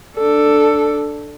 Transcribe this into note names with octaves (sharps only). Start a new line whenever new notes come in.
D4 A4